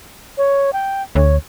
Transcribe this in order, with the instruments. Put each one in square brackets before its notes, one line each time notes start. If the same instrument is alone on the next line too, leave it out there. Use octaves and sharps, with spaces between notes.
[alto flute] C#5
G5
[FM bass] D2 [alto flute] C#5